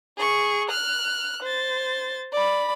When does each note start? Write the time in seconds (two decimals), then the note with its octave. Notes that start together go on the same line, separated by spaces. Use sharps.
0.18 G#4 C#6
0.70 F6 F#6
1.42 C5 A6
2.32 D5 B5